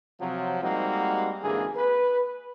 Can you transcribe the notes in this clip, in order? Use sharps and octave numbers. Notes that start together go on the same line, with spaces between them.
C3 F3 F#3
G3 G#3 A#3 C4 D#4 F#4
G#1 D3 E3 A#3 G#4
B4